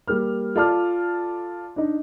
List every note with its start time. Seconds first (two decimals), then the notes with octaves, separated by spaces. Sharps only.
0.08 G3 A#3 F6
0.56 F4 A4 D5 A5 D6 F6
1.76 D4 D#4